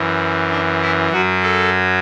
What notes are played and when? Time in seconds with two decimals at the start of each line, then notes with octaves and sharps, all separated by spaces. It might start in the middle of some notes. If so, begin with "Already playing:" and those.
Already playing: F#2 E3
0.51 D4
0.82 E4
1.12 F#2 F#3 F#4
1.43 A4